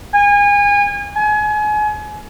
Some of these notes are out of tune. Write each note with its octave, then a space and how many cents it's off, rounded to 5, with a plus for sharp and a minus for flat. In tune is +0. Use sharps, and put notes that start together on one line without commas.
G#5 -30
G#5 +30